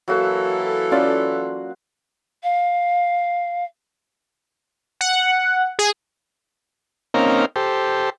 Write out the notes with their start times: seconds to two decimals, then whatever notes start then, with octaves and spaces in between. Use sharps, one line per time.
0.08 E3 F#3 A#3 E4 F#4 A4
0.92 C#4 F4 D5 F#5 C6
2.43 F5
5.01 F#5
5.79 G#4
7.14 A#3 C4 C#4 D#4 A#4 F5
7.56 G4 A4 C5